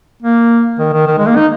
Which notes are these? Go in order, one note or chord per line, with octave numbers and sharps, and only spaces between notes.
A#3
D#3
D#3
D#3
G#3
A#3
D#4